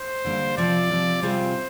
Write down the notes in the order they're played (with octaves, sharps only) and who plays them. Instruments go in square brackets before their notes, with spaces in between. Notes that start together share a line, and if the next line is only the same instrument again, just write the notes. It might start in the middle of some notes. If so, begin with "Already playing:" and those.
Already playing: [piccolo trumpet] C5
[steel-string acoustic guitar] D3 G3 A#3
[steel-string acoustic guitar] C3 F3 C4 [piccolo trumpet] D5
[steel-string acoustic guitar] C3 F3 C4
[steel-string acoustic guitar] C3 G3 C4 F4 G#4 [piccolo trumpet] C5